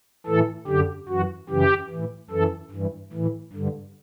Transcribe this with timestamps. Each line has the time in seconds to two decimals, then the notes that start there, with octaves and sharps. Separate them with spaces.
0.27 A2 E3 A4
0.67 F#2 D3 G4
1.09 F#2 E3 F#4
1.49 F#2 C#3 E3 G4
1.90 E3
1.95 A2
2.30 F#2 E3 A4
2.71 G2 E3
3.13 A2 E3
3.53 G2 D3